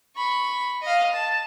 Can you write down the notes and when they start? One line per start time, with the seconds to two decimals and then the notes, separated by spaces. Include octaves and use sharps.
0.16 B5 C#6
0.82 D#5 F5
1.14 A5